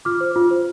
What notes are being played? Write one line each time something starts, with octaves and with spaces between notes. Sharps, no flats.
F4 D6 F6
C5
F4
C5